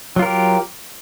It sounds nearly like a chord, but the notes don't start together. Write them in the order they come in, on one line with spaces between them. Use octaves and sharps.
F#3 F4 A#4 G4